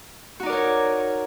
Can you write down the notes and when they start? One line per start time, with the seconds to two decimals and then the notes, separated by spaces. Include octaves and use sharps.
0.40 F#4
0.43 D#4
0.46 D5
0.49 A#4
0.52 C#5